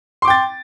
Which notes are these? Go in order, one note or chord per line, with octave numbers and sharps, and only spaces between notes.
G5 C6 D6 A6